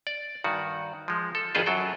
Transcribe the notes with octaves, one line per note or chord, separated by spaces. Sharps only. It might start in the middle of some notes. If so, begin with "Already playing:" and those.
D5
G2 D#3 F#4
F3 G#3
A4
G#1 F2 F4 G#4 B4 C5
F#2 F#3 A4 G5